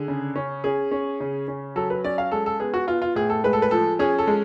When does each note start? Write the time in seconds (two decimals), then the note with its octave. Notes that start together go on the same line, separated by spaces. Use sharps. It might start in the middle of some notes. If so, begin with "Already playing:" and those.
Already playing: D3 G#4
0.08 C#3
0.36 C#4
0.64 C#4 G#4
0.91 C#4
1.20 C#3
1.48 C#4
1.76 F#3 A4
1.90 B4
2.04 C#4 D5
2.18 F5
2.32 G#3 A4
2.46 A4
2.60 B3 G#4
2.74 F#4
2.87 B3 F4
3.02 F4
3.15 A2 G#4
3.30 A4
3.44 G#3 B4
3.53 A4
3.62 B4
3.71 F3 A4
3.99 C#4 G#4
4.19 A4
4.27 G#3